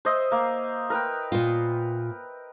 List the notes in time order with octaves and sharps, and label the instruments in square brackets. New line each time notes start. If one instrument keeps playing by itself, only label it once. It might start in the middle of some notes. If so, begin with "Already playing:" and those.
[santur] C5 D#5 E5
A#3
A#4 B4 G5
[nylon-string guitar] A#2 F4